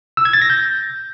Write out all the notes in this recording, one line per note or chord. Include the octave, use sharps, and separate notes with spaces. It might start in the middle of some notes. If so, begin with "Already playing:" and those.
E6
G#6
A6
A#6
G6